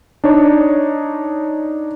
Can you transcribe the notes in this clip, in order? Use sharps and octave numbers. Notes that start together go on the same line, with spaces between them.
D4 D#4 C#5